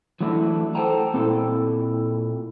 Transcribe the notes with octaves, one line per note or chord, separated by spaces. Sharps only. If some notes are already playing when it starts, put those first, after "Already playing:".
E3 F#3 A3 D4 E4
A4 C5 F#5 G5 A5 A#5
A#2 C4 E4 A4 G5